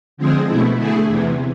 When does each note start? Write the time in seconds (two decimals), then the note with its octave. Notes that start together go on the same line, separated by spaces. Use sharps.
0.17 D3 F3 G#3 C4 G#4
0.47 B2 A3 E4
0.78 D3 A3 E4 G#4
1.08 E2 C3 E3